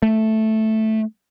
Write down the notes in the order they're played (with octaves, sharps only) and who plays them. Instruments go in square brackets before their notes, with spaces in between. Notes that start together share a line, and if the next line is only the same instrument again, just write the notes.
[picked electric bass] A3